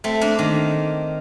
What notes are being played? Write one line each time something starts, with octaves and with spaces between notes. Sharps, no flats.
A3 C4
A#3 D4
D#3